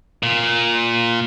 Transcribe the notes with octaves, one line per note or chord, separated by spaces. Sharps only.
A#2